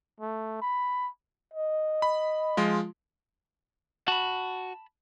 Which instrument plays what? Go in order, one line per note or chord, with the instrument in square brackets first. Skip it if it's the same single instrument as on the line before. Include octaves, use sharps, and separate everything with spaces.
[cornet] A3
B5
[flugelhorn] D#5
[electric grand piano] B5
F3 G#3 F4
[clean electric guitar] F#4 [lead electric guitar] A5 B5